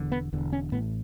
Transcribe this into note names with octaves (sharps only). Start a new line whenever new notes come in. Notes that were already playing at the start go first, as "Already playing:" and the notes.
Already playing: E1 E2 D3
B3
E1 E2 D3
C#4
A1 A2 B3